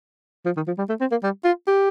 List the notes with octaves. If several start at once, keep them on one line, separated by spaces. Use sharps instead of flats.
F3
D#3
F3
G3
A3
C4
A#3
G3
F4
G4